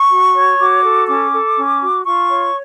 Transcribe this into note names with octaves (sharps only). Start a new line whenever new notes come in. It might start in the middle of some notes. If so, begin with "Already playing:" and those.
Already playing: C#6
F#4
C#5
F#4 D6
A4
C#4 D6
A4
C#4
F#4
F4 C#6
C#5